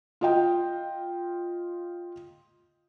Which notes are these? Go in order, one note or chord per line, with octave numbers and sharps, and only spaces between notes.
F4 D#5 G5